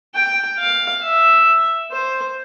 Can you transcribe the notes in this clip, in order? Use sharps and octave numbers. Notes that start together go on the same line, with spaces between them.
G5
F5
E5
C5